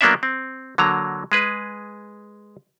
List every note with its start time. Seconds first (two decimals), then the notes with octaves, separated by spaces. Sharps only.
0.01 F#3 A#3 B3 D4 D5 E5
0.23 C4
0.78 D3 F#3 A#3 A#5
1.32 G#3 G#4 B4